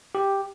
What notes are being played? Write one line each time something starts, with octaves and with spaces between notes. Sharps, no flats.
G4